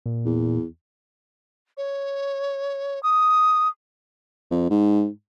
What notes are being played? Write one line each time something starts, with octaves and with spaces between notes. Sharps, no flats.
A#2
E2
C#5
D#6
F2
G#2